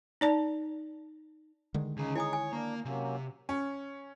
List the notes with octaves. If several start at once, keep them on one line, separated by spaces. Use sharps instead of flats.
D#4 D5 A5
D3 D#3 G#3
C#2 C#3 D#4 G#4
E4 C#5 G#5 D#6
G#5
A#3 D4 A#5
C3 F#3 A#3 C#4
C#4